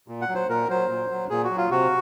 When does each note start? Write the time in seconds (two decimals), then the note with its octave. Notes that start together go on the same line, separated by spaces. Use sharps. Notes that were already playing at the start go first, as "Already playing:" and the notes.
0.08 A#2
0.22 F#5
0.29 F#3
0.35 C5
0.49 A#2 A#4
0.70 F#3 C5
0.90 A#2
1.11 F#3
1.30 A#2 G#4
1.44 F#4
1.50 F#3
1.57 F4
1.71 C3 F#4